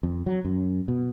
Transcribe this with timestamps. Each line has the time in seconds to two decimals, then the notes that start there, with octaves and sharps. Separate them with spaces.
0.03 F2
0.26 F#3
0.45 F#2
0.88 B2